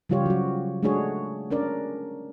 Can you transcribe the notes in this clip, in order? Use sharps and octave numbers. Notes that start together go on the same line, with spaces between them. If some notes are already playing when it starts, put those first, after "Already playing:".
C#3 F3 G3 F4 G4 C#5
F#3 F#4
G#3 A3 D4 F#4 G#4 C#5
C#4 D4 A#4 D5